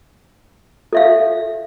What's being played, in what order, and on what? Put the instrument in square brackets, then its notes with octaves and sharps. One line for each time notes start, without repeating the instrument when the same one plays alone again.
[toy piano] A4 E5 F5